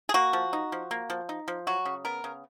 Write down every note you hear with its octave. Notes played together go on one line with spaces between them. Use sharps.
G#4
A#3 F#4
F3
D#4
F3
A#3
F3
D#4
F3
F#3 F#4
C#3
B3 A#4
C#3